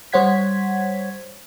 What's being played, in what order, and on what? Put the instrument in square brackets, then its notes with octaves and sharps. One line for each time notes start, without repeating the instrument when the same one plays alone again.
[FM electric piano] G3 C5 C#5 F#5 G#6 B6